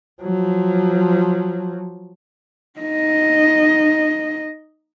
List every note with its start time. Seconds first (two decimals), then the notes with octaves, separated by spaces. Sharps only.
0.22 F3 F#3
2.80 D#4 D#5